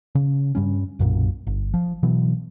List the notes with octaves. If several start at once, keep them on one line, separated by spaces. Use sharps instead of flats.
C#3
G2 G3 C#4
B1 F#2 A#2
G1
F3
B2 E3 F#3